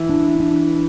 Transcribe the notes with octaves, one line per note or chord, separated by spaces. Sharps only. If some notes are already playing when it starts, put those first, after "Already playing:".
Already playing: E3 E4
D4
D4